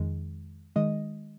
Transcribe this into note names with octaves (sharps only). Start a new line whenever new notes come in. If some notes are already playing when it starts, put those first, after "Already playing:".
Already playing: F2 D#3 G#3
D#3 G#3 D#5